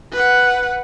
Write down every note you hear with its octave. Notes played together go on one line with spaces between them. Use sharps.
B4 F#5